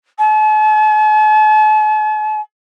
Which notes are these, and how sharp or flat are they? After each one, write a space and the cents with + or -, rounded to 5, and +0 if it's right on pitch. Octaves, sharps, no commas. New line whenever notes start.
A5 -45